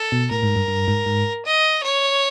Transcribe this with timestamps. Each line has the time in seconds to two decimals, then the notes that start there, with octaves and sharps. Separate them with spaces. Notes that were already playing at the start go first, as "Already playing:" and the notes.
Already playing: A4
0.12 B2
0.31 A2 A#4
0.43 G#2
0.56 G2
0.68 G2
0.88 G#2
1.06 G#2
1.45 D#5
1.83 C#5